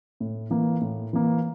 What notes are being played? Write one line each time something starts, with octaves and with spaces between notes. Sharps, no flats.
A2
E3 A#3
A2
E3 A#3